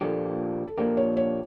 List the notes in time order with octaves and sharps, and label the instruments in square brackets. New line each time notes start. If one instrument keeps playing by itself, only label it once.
[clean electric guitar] A#2 F3 A#3 D4 G4 [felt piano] A4
[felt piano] A4
[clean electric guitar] A#2 F3 A#3 D4 G4 [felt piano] A#4
[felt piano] C#5
C#5